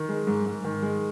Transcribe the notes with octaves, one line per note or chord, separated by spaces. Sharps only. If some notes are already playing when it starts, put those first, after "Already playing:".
Already playing: D#3
G#3
G#2
G#2
D#3
G#3